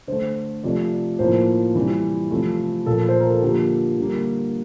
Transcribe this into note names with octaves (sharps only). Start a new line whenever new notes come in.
D3 A3 C5
C3 F3 A3 D5
A2 F3 A#3 C5
C3 E3 G3
C3 F3 A3
A#2 F3 A#3 A4
C5
A#4
A4
D3 F3 A#3 G4
D3 G3 A#3